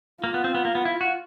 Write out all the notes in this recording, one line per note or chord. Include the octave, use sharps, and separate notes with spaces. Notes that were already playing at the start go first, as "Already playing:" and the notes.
A#3 F4
B3
C4
B3
A#3
B3
E4
F#4